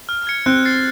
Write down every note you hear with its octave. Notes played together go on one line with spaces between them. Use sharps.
F6
G#6 C#7
C4 F#6
A6 C7